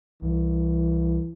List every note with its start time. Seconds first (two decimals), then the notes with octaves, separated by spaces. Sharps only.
0.22 C2 E3